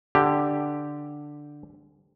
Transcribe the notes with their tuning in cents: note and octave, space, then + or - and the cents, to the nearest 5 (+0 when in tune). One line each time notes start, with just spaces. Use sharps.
D3 +5 G4 +0